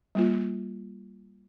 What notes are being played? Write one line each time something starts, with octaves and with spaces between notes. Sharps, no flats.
G3 A#3 F4